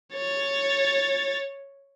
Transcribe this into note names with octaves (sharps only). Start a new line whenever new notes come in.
C#5 A6